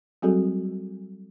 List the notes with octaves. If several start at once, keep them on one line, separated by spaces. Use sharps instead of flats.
F#3 G3 C4 F#4 G#4 A4